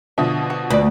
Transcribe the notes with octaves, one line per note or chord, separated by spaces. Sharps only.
B2 D3 F3 E5
F#4
D2 B4 D5